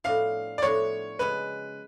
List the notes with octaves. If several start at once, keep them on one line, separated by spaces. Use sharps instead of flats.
A2 F3 B3 D4 F#4 F5
D5
A2 F3 B3 D4 F#4 C#5
C#3 G#3 C#4 B4